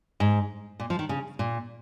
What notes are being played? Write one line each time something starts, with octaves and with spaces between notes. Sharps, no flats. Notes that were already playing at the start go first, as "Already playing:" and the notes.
G#2
A#2
F3
D#3
C#3
A#2